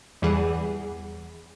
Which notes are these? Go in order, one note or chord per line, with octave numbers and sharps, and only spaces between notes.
E2 E3 G3 G#4 F#5